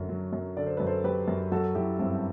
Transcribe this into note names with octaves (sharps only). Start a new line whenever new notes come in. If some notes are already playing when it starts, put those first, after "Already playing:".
Already playing: F#2 D3
F#3
F#2
D3 D5
C5
F#2 B4
A4 C5
F#3 G4 B4
F#2
F#3 F#4 A4
F#3 E4 G4
G2 C4 E4